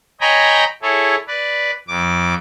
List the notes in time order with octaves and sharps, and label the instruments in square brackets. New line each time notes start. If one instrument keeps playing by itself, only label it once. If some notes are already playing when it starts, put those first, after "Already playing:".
[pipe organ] C#5 D#5 G5 G#5 A#5 B5
E4 G#4 A4 C#5
B4 D5
F2 D6